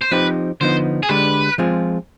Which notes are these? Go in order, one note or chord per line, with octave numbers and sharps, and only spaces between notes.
C5
F3 C4 D#4 G4 B4
D3 F3 B3 D#4 C5
G#4
D3 G#3 D4 G4 B4
F3 G#3 C4 F4 G#4